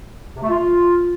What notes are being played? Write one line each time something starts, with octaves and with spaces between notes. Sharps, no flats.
C3
A3
F4